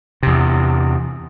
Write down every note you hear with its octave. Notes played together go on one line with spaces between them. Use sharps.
E2 C3